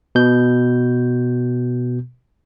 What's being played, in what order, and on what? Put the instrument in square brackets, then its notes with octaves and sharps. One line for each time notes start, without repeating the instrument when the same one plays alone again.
[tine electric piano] B2 G6